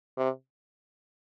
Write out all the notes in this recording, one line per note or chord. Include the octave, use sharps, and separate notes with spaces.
C3